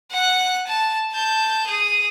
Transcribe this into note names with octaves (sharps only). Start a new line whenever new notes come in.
F#5 F#6
A5
A5 G6
G#4 D#6